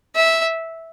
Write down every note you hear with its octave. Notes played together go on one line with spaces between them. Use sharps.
E5